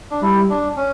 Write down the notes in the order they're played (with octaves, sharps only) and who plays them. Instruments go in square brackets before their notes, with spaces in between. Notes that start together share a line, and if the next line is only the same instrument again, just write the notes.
[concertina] D4
[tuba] G3 [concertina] E4
[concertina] D4
C#4